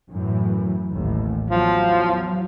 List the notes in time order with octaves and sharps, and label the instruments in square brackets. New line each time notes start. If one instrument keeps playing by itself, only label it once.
[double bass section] F#2 A2 E3
A1 D#2
[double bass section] E2 F#3 [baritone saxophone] F3